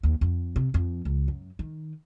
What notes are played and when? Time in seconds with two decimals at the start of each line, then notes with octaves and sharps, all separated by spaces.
0.03 D#2
0.21 F2
0.56 C3
0.74 F2
1.05 C#2
1.28 F#2
1.59 D#3